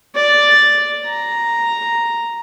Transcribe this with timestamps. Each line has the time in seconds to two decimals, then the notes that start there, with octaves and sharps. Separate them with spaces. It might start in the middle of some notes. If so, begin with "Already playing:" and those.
0.15 D5
1.06 A#5